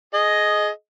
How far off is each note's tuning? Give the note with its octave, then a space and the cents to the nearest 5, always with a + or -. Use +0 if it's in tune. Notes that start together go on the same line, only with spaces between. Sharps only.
G#4 +25 D#5 +0